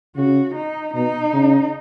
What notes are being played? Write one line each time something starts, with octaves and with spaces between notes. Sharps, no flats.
C#3 F#4
D#4
B2 D#4
C#3